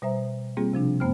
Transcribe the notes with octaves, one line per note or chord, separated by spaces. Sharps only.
B2 G3 C5 E5 A#5
G3 A#3 C4 F4 G4 G#4
C3 F3 D4
F#2 A3 B3 C5 G5 F6